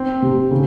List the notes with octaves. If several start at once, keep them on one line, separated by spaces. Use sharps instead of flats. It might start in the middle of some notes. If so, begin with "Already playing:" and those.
Already playing: C4
C3
C#3